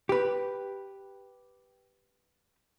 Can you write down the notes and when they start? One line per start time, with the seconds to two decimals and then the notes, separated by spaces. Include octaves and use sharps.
0.09 G4 B4